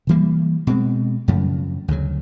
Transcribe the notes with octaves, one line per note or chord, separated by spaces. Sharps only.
C3 E3 G3 A#3
B2 G#3 C4
F#2 C#3 F3 A3
D2 C#3 F#3